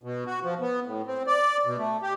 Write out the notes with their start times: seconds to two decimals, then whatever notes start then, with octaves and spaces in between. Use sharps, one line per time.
0.03 B2
0.26 F#4
0.43 F3
0.61 B3
0.86 A2
1.07 C4
1.27 D5
1.66 B2
1.78 A3
2.02 G4